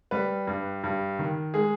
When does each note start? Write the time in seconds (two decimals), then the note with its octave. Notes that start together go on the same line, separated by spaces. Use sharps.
0.11 G3 B4
0.47 G2
0.84 G2
1.19 D#3
1.54 G#3 G#4